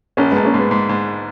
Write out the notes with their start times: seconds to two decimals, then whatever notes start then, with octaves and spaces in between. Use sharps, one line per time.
0.17 A#1 A#3 C#4
0.31 G#3 B3
0.36 A#1
0.44 A#3 C#4
0.54 G#2 G#3 B3
0.71 G#2
0.89 G#2